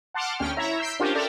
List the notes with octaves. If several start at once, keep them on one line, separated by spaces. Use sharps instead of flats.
F#5 A5 C6 D6 F6
D2 C#4 G5 F6
E4 C#5 E5 A#5
E6 G6 B6 C7 D7
C#4 D4 F4 G4 A#4 C5
A4 A#4 D5 E5 G5 A#5